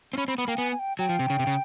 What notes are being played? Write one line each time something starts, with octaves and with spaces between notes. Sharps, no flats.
C4
C#4 B5
C4 B5
B3 B5
A#3 G5
B3 G#5
G#5
G5
F#3 G5
F3
C3
C#3
C3
C#3